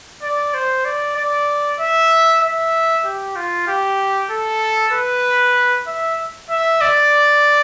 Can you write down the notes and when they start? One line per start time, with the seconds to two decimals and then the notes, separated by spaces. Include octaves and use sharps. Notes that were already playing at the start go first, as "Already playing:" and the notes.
0.22 D5
0.54 C5
0.85 D5
1.17 D5
1.80 E5
2.42 E5
3.05 G4
3.36 F4
3.68 G4
4.31 A4
4.93 B4
5.87 E5
6.50 E5
6.81 D5